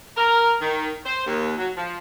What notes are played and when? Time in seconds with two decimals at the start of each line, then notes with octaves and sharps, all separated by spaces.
0.17 A#4
0.61 D#3
1.05 C5
1.27 D#2
1.58 F#3
1.76 F3